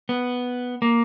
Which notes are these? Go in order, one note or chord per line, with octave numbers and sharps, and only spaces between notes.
B3
A#3